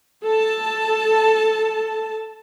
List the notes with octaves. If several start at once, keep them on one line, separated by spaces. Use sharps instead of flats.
A4 A5